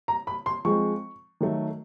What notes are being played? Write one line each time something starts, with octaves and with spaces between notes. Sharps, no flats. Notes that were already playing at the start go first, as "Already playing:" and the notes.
A#5
B5
C6
F3 G#3 C4 C#6
D#3 F#3 A3